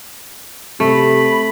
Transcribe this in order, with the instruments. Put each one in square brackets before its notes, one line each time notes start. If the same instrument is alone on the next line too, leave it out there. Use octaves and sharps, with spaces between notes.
[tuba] C3 [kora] A3 [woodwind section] B5